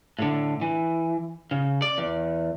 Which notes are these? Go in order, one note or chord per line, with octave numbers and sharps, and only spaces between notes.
A2 D3
E3
C#3
D5
E2